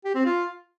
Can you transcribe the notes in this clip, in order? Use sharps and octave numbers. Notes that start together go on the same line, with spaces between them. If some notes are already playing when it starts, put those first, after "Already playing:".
G4
C4
F4